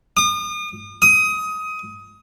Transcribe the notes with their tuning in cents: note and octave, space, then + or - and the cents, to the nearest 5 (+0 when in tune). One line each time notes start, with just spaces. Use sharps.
D#6 -40
D#6 +20